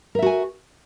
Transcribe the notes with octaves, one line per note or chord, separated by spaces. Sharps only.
F#4 A#4 E5 G#5